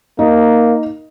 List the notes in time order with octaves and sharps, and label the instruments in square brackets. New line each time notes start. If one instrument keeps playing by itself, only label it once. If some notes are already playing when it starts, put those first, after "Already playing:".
[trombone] A#3 [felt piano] D#4